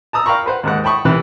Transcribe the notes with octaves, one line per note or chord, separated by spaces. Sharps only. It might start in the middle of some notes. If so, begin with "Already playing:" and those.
A5 A#5 D#6 E6
F5 G5 A#5 B5 C#6
B4 C5 F#5
D#2 G#2 F#5
G5 A5 B5 C#6 D#6
C2 C3 E3 B5 F#6